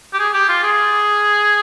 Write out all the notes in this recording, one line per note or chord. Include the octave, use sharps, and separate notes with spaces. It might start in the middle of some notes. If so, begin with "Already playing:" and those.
G4
G#4
G4
F4
G#4